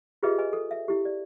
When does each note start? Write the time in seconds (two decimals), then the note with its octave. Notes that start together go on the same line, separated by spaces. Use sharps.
0.23 F4 G4 G#4 B4 D#5 E5
0.38 B4 D#5 G#5
0.53 A4
0.71 E5
0.88 E4 G4
1.05 D5